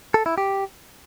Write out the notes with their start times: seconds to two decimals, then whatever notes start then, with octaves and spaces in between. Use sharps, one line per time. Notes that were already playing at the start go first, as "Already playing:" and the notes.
0.14 A4
0.26 E4
0.38 G4